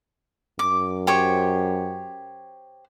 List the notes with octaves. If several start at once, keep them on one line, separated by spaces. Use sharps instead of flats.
F#2 D6
G4 C5 C#5